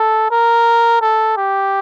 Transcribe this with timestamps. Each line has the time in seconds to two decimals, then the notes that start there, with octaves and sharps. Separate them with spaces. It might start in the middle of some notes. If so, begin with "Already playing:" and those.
Already playing: A4
0.31 A#4
1.01 A4
1.37 G4